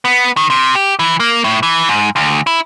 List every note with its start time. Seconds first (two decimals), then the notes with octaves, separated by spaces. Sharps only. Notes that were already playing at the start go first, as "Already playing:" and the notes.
0.05 B3
0.37 D#3
0.50 C3
0.75 G4
0.99 E3
1.20 A#3
1.44 A2
1.63 E3
1.89 G#2
2.16 D2
2.47 E4